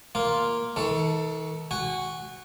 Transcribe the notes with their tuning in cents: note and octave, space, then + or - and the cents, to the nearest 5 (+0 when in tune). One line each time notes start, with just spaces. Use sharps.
A#3 +0 F4 +0
D#3 +45 A4 +15
F#4 +0 G#5 -35